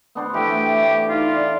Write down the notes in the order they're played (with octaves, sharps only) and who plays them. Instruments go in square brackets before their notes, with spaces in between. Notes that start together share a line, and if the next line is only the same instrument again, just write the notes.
[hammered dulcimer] B3 D4 C5
[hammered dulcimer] E3 A3 [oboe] G4 [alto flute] G5
[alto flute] D#4 [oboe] F4
[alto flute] D5